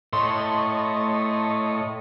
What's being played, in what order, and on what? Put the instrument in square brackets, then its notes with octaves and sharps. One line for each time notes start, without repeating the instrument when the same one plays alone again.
[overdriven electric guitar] A2 [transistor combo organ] A4 C#5 D#5 [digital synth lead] C6